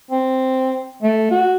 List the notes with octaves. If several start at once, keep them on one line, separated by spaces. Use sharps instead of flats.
C4
A3
F#4